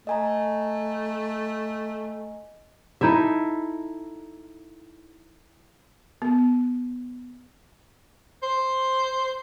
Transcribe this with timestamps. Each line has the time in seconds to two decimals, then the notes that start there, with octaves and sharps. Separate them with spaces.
0.07 A3 D#5 G#5 A#5
3.01 D#4 E4 A4 E5
6.22 B3
8.43 C5